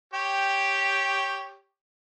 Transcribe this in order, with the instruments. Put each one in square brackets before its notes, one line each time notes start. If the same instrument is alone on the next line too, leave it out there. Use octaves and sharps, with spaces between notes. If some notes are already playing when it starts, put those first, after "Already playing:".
[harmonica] G4 C#5 G5